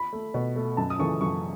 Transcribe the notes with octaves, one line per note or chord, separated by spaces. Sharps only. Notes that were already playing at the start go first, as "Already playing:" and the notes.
Already playing: B5
A3
B2
A3
F#2 A5
D#6
C#3 E3 A3 C#6
F#2 C#6